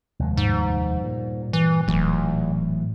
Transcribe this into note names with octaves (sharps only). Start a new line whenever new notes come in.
F1 D#2 G#3
G#2
G2 A#2
E3
D#1 A2 E3 F#3